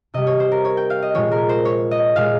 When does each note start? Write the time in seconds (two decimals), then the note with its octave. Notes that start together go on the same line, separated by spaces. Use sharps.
0.14 C3 G3 D#5
0.27 C#5
0.40 C5
0.52 A#4
0.65 C#5
0.77 G5
0.90 F5
1.02 D#5
1.15 A#2 F3 G#3 C#5
1.32 A#4
1.49 C5
1.65 C#5
1.91 D#5
2.16 A#2 G#3 F5